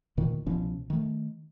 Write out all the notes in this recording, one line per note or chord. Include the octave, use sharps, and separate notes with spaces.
D2 A#2 D#3
C2 B2 F3 C#4
D#3 A3